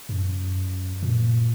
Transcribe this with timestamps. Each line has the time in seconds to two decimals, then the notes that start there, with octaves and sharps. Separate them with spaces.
0.09 F#2
1.02 A#2